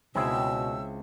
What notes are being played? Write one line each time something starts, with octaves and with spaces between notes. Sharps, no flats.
C#2 B2 C4 E4 G#4 G5 E6